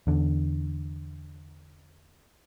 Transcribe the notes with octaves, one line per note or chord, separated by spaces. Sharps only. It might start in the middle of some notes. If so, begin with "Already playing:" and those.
E2 D3